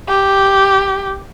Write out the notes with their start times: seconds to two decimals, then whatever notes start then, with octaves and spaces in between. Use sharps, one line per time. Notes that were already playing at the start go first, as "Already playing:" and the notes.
0.09 G4